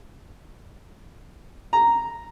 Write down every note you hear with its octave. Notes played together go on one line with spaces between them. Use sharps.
A#5